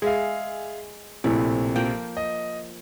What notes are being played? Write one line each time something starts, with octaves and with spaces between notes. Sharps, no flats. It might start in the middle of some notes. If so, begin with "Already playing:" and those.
G#3 G#4 E5 F5
A#1 A2 C3
F3 A#3 G5
D#5